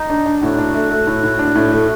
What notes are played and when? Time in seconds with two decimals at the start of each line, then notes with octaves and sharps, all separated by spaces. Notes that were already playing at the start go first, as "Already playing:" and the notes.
Already playing: D#4
0.10 D4
0.26 D4
0.42 A2 F#4
0.58 D4
0.75 A3
0.91 A3
1.07 A2
1.24 A2
1.39 D4
1.55 A2
1.72 A3